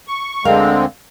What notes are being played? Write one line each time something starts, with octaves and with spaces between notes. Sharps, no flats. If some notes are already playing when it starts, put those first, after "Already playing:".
C#6
D2 D3 G#3 C4 A#4 F5